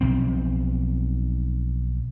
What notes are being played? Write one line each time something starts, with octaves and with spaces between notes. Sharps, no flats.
B1 F3 C4